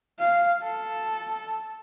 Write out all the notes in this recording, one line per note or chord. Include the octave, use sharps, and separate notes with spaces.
F5
A4